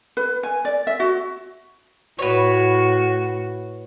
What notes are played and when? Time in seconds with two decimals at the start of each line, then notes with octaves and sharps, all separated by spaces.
0.17 B4
0.43 G#5
0.65 D5
0.87 E5
1.00 F#4
2.19 A2 F#4 B4 C#5